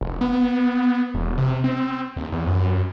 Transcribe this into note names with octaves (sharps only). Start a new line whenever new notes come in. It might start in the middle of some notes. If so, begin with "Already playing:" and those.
F1
B3
E1
C3
C4
D#2
E2
F#2